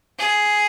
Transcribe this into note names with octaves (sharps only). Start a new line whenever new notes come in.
G#4